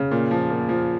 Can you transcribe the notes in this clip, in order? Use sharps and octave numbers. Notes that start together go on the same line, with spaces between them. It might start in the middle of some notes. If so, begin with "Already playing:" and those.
Already playing: C#3
A#2
F3
A#2
F3